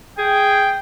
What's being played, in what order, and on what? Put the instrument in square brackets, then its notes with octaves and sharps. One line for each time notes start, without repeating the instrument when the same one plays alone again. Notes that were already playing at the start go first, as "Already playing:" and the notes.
[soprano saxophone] G#4 [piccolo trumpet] G5